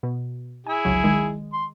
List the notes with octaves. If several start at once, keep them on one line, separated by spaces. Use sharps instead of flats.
B2
E4 G#4 G#5
G1 C#2 F#3
D#3 G#3
C6